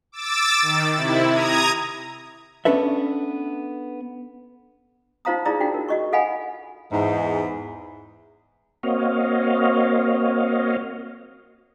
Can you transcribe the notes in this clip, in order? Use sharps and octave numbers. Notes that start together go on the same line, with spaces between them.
D6 E6 A6
D#3
C3 E4
A#5 D#6 G#6
B3 C#4 D4 A4 B4 E5
D#4 F4 C5 F5 A#5 D#6
D#4 E4 G#4 D5 A#5 D#6
D4 D#4 F4 F#4 G5
A#4
F#4 D#5 C#6
A4 D#5 F5 F#5 G#5 B5
E2 G#2
A#3 C4 F#4 C#5 D#5 F5